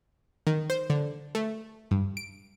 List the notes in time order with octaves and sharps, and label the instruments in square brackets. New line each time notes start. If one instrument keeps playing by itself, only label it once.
[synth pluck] D#3
C5
D3
A3
G2
D7